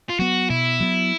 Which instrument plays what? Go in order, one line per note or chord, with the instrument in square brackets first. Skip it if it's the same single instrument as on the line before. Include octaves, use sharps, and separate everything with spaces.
[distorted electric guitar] F4
[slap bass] F#3 B3 [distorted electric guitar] F#4
[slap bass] B2 [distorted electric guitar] E4
[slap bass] F#3 B3